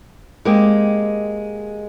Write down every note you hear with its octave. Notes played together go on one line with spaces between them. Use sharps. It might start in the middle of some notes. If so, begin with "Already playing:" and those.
G#3 A#3 C4 G4